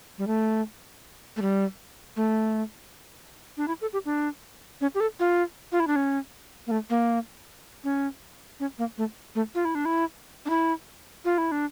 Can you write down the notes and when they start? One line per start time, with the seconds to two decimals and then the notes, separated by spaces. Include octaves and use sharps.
0.18 G3
0.27 A3
1.36 A3
1.42 G3
2.16 A3
3.57 D4
3.68 E4
3.81 A4
3.93 G4
4.05 D4
4.81 C#4
4.95 G4
5.00 A4
5.20 F4
5.72 F4
5.80 E4
5.87 D4
5.96 C#4
6.67 A#3
6.71 A3
6.90 A#3
7.84 C#4
8.60 C#4
8.78 A#3
8.98 A3
9.35 A3
9.55 F4
9.65 E4
9.75 D4
9.85 E4
10.46 D4
10.50 E4
11.25 F4
11.38 E4
11.52 D4